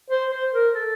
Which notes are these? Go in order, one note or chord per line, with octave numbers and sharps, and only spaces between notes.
C5
C5
A#4
A4